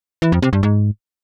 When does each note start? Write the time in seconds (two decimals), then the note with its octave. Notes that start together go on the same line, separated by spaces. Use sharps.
0.22 E3
0.32 F2
0.42 C3
0.53 G2
0.63 G#2